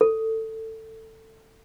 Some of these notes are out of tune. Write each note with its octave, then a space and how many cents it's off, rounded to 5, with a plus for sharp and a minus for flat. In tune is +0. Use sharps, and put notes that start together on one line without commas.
A4 +15